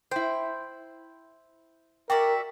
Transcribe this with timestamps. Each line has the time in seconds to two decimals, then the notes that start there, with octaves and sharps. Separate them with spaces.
0.11 E4 C5 G5
2.10 F#4 A#4 D5 E5 G5